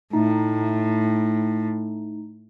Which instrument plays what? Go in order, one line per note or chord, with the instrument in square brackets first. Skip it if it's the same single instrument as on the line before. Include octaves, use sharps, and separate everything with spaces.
[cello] A2 [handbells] A3 D#4